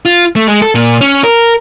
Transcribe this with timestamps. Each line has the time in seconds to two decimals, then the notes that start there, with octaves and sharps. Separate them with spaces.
0.05 F4
0.36 A3
0.48 G#3
0.62 A4
0.75 A#2
1.01 C#4
1.24 A#4